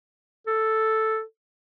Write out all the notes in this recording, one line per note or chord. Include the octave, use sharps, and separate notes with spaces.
A4